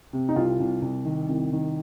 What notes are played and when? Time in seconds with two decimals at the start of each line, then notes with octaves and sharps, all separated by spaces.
0.13 C3
0.29 D#4
0.36 C2 F4
0.60 C2
0.82 C2
1.05 D#3
1.29 C2
1.53 D#3